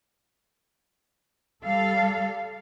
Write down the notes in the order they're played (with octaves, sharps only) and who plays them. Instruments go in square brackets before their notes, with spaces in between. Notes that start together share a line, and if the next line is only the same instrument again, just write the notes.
[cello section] G3 A4 F5